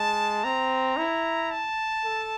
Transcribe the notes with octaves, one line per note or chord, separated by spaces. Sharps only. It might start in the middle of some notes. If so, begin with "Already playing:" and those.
Already playing: G#3 A5
C4 A#5
E4
A5
A4